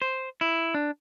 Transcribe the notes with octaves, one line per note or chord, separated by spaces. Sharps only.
C5
E4
D4